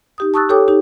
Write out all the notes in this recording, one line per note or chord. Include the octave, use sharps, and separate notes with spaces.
D#4 G4 D#6
A5 C#6 D#6 E6 F#6 A6
G4 A4 C#5 G5 D6 D#6
D#4 G4